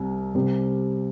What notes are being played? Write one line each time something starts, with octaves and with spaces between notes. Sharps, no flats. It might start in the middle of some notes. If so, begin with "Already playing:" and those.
Already playing: C2 C3 G3
C2 C3 G3 C4